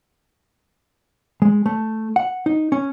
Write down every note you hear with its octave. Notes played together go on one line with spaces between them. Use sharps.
G#3
A3
F#5
D#4
C#4